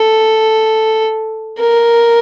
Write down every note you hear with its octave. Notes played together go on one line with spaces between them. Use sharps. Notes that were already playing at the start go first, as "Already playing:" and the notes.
Already playing: A4
A#4